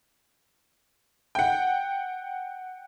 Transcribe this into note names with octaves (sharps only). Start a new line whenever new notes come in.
F#5 G5